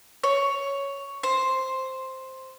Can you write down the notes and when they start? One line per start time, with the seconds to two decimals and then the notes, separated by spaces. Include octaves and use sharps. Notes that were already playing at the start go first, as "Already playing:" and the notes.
0.24 C#5
1.23 C5